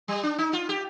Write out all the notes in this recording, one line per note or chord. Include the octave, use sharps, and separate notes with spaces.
G3
D4
D#4
F4
G4